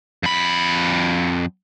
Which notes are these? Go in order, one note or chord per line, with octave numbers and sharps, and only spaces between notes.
F2 B5